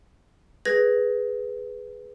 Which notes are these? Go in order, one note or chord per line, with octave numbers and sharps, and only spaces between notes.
G#4 B4 G#6 A#6